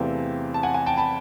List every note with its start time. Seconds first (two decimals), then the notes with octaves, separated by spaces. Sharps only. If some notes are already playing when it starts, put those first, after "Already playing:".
Already playing: E2 C3 E3 A3 C4 F5
0.54 A5
0.63 F#5 G#5
0.74 F#5 G#5
0.86 G5 A5
0.97 A5 B5